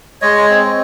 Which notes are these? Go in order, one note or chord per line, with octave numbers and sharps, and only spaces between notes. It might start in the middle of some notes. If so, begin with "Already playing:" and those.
G#3 C#5 D#5
C4